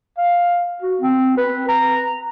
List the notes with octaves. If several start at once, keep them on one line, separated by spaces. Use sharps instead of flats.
F5
F#4
C4
B4
A#5